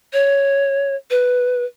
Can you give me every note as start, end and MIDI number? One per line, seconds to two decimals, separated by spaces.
0.13 0.95 73
1.11 1.64 71